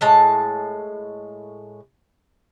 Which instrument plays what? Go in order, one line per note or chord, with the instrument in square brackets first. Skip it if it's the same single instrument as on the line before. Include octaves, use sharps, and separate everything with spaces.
[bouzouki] A2 G#3 A5